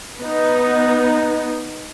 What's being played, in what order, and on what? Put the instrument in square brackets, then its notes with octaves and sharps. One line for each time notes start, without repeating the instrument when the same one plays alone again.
[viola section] B3 D#4